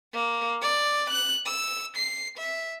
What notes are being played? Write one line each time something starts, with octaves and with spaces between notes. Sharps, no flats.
A#3
D5
F#6
E6
C7
E5